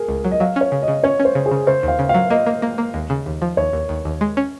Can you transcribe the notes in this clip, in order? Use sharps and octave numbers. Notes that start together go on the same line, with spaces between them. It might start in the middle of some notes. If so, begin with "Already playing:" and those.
Already playing: G#4 A#4
C#2
F#3
D#5
F#3 F5
C#4 C#5
C#3
D#5
C#3
C#4 C#5
C#4
C5
C#3
G#4
C#3
C#3 C5
D#2 F5
C#3
F5
F#3
A#3 D#5
A#3
A#3
A#3
D#2
C#3
D#2
F3
D#2 C#5
D#2
D#2
D#2
G#3
C#4